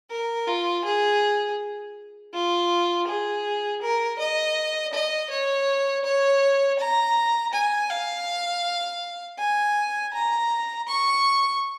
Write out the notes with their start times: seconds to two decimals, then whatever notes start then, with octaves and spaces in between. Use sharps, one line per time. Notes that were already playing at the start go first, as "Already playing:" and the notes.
0.11 A#4
0.47 F4
0.84 G#4
2.34 F4
3.07 G#4
3.82 A#4
4.19 D#5
4.93 D#5
5.31 C#5
6.05 C#5
6.79 A#5
7.54 G#5
7.90 F5
9.39 G#5
10.14 A#5
10.88 C#6